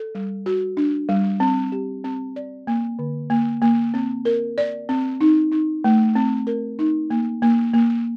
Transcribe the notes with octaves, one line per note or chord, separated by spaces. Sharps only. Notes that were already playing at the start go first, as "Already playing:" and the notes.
Already playing: A4
G3
F#4
D4
G3
C4
G4
C4
D5
A#3
D3
A#3
A#3
C4
A#4
D5
C4
D#4
D#4
A3
C4
A#4
D#4
A#3
A#3
A#3